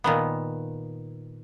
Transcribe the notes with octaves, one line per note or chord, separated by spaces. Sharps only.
A#2 D#3 B3